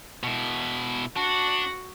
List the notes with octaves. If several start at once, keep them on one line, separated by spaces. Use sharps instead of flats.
B2 E4
D4 F#4